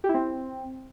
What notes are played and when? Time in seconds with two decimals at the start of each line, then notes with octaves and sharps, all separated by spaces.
0.04 G4
0.09 E4
0.14 C4